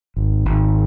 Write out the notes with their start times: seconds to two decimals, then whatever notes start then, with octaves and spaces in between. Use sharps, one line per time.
0.17 G#1
0.45 G#1